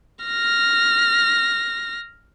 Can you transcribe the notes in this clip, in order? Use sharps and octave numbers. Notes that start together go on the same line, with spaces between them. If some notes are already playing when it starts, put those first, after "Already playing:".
F6 A#6